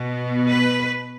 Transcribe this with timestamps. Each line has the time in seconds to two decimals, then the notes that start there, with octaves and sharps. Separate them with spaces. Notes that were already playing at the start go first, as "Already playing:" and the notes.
Already playing: B2 B3
0.49 B4